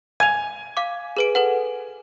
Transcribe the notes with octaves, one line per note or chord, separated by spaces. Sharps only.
G#5 G#6 D#7 F7
F5 D6
G#4 B4 D7
A4 B4 F#5